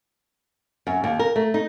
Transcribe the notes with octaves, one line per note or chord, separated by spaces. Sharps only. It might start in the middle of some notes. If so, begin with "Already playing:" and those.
F#2
D#2
A#4
A3
D#4